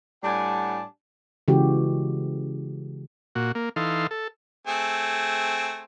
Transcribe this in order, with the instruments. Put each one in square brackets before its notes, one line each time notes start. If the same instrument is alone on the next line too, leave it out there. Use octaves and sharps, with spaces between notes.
[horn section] A2 G3 D4 F#5 G#5 A5
[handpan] C#3 E3 G#3 F#4 G4
[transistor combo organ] A#2 F#4
A#3
E3 D#4 A4 F5 C6
A4
[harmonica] A3 C4 G#4